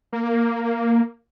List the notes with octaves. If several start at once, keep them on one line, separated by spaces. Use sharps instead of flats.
A#3